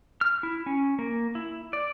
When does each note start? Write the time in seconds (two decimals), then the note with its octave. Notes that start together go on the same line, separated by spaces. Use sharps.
0.21 F6
0.43 E4
0.66 C#4
0.99 A#3
1.35 E4
1.73 D5